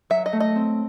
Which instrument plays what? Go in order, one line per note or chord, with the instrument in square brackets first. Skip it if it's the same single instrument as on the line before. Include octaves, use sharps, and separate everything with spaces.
[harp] F#3 [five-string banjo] E5
[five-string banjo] D#5
[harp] A3
[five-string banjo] D#5
[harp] C4